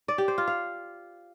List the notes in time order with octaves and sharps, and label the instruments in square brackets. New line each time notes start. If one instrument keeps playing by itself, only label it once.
[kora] D5
G4
C5
F4
F5